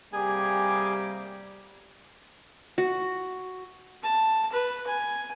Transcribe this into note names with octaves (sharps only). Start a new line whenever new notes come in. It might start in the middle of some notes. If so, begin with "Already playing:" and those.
C3 G3 A#3 G4 G#4 G#5 D6
F#4
A5
B4
G#5